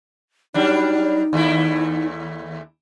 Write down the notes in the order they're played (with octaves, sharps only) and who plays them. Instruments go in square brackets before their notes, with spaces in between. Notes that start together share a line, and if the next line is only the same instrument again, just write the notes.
[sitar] F#3 G3 D4 [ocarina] D#4
[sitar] D#2 A3 E4